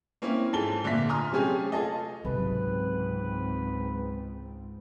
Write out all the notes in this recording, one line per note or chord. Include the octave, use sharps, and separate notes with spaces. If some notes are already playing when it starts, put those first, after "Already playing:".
A#3 C4 C#4 E4
G#2 F3 A4 G#5 G7
A#2 D3 A#3 E5 B6
G#5 A#5 C6 D#6 F6
C3 F#3 A3 C#4 G4 G#4
F4 G#4 A4 D#5
C#2 G#2 C3 F#3 C4 B4